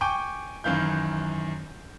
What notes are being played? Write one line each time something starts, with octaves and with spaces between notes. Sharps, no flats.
G5 G#5 C#6 D6 G6
F#2 D#3 E3 F5 G6